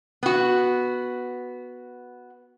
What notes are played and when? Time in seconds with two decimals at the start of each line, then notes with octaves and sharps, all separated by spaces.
0.23 B3 F#4